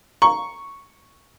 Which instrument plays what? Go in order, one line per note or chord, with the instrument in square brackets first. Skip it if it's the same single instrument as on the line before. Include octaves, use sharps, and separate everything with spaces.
[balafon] A#5 [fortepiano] C#6